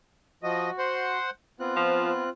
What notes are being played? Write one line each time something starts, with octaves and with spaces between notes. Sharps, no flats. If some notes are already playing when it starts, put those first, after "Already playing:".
F3 F#4 D#5
C5 F#5
B3 C4 F4 F#6
F3